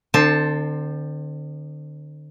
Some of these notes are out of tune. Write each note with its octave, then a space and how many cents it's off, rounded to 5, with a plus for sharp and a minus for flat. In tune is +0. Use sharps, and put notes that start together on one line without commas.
D3 +35 C4 +0 A5 +0